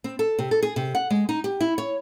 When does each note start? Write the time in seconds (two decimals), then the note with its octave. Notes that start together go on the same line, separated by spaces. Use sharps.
0.04 C4
0.19 A4
0.39 C3
0.51 A4
0.62 G#4
0.76 C3
0.95 F#5
1.10 G#3
1.29 D#4
1.44 G4
1.60 E4
1.78 C#5